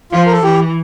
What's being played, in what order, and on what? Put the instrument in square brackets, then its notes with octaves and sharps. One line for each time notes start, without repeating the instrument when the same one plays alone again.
[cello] F3 [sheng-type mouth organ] F4
[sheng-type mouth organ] A#4
A4
[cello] E3 [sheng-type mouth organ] G4